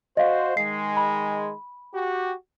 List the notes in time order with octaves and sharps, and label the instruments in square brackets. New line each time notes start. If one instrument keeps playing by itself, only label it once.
[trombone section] F#4 C5 [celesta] D#5 F5
[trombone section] D#3 G#3 [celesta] C7
[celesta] B5
[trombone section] F#4 G4